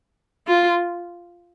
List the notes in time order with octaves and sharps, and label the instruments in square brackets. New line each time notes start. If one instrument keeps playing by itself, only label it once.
[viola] F4